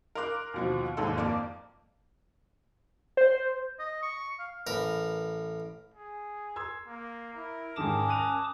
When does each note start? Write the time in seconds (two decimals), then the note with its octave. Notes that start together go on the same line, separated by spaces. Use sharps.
0.15 A#4 F5 C6 D6 F#6
0.54 D#2 B2 F3
0.97 G#1 D#2 G#2 A4 C6
1.17 F2 A#3 D5 A5 D6
3.17 C5
3.80 D#5
4.03 C#6
4.39 F5
4.67 A1 A#4 B4
5.94 G#4
6.56 C6 E6 G#6
6.87 A#3
7.34 E4 A#4
7.76 G#2 D#3 C#4 A5 D6 D#6 E7
8.09 F#6 D#7 F7